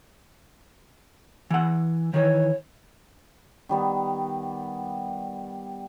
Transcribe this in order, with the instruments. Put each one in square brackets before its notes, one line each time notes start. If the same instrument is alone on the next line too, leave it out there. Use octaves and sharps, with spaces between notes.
[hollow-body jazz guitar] E3 F#5
[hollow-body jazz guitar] D#3 E3 [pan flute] C#5
[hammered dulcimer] D#3 G3 B3